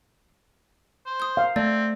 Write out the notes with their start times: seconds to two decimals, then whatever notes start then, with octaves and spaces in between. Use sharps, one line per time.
1.07 C5
1.20 D#6 G6
1.37 F5
1.56 A3 C4 D5